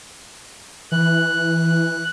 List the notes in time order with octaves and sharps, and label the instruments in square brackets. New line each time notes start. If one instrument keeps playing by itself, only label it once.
[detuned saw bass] E3 [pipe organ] F#6